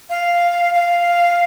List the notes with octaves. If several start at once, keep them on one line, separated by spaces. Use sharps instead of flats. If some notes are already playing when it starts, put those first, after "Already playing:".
F5
F5